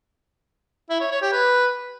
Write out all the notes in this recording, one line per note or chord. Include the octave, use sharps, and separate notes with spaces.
E4
C#5
C#5
G4
B4